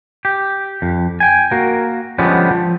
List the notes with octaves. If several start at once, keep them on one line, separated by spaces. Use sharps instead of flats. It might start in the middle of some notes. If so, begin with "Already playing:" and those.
G4
F2
G5 G#5
A#3 F#4 A#4
D3 F3 G3 G#3 B3 C#4
F3